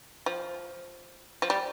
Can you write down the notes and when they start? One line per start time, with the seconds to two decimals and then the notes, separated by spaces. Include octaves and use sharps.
0.26 F3
1.42 F3
1.50 G3